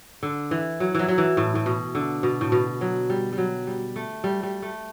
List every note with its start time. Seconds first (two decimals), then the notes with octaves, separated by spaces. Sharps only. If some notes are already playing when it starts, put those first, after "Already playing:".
0.23 D3
0.51 E3
0.80 F#3
0.94 E3 F#3
1.08 F#3
1.18 E3
1.37 A2
1.55 A2
1.66 B2
1.95 D3
2.23 B2
2.41 A2
2.52 B2
2.81 F#3
3.10 G3
3.33 G3
3.38 F#3
3.67 G3
3.96 A3
4.24 G3
4.43 G3
4.62 A3